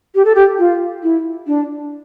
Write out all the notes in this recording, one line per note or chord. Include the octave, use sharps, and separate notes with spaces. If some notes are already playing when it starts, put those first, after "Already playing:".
G4
A4
G4
F4
E4
D4